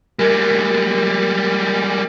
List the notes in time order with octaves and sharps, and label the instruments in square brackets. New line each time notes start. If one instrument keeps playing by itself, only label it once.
[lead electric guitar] G3 G#3 [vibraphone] A#4